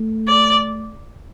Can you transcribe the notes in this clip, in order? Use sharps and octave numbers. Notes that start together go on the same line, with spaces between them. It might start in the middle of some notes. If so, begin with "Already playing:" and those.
Already playing: A3
D5